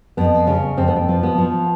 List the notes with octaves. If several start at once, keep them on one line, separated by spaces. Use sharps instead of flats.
F2 B3
C#3 C#4
F2 C4
B3
C4
F3
B3
F3